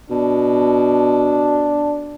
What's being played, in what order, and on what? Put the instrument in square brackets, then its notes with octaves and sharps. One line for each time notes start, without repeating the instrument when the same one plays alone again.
[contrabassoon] B2 [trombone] D4